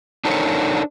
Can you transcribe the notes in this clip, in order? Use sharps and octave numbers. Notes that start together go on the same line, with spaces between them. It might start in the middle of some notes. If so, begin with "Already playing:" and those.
D4 D#4 A4 A#4 C5 C#5